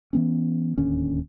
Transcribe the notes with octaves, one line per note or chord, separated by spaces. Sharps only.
E3 B3 C#4
D1 D#2 D3 C#4